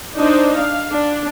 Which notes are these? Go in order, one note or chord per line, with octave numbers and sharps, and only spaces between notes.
D4 D#4 C5
F5
D4